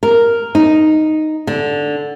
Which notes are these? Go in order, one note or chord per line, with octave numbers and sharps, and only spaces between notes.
A#4
D#4
D3